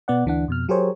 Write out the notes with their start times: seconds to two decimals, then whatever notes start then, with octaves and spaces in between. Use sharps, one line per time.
0.08 B2 B3 D5 F#5
0.26 D2 E3 D4 F#5
0.48 F2 B2 F6
0.69 F#3 G4 G#4 A#4 C5 C#5